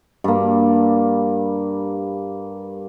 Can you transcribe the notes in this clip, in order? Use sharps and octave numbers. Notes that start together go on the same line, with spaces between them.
G2 A#3